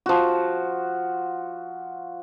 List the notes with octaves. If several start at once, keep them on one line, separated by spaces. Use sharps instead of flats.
F3 F#4